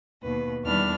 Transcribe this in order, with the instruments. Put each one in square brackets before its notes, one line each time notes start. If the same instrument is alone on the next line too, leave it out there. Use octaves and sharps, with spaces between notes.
[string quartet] D#2 B2 B4
E2 D#3 G3 D4 B5 F6